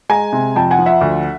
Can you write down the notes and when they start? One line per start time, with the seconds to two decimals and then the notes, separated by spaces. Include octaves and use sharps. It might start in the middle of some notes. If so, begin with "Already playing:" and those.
0.09 G#3 G#5 A#5
0.33 C3
0.56 F2 G5 A5
0.71 F#5 G#5
0.79 F3
0.86 E5 F#5
1.01 D2